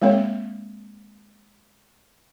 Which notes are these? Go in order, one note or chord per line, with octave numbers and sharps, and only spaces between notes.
G#3 A#3 C4 C#5